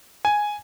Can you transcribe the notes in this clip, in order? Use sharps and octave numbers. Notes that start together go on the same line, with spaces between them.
G#5